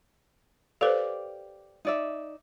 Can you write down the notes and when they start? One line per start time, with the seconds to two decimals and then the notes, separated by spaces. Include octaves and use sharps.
0.81 G4 A4 B4 C5 D5 F5
1.85 D#4 D5 E5